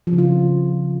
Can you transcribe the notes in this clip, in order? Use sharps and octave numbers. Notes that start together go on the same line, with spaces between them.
F3
C#3
F4